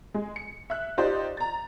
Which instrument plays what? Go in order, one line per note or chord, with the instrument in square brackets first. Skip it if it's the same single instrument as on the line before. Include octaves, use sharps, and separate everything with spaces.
[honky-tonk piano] G#3
C#7
E5 F#6
D#4 F4 G4 C5 D5 D#5
A#5 A6